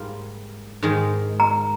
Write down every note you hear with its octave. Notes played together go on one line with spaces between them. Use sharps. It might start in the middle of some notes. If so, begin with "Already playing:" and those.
Already playing: G#2 G3 A#3 F4
G#2 D#3 G#3
A#5